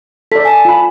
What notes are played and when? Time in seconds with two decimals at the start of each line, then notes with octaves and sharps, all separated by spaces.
0.32 A4 D5 B6
0.45 G#5 A5
0.65 F4 B5